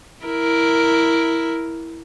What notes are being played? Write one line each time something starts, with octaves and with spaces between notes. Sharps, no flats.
E4 A#4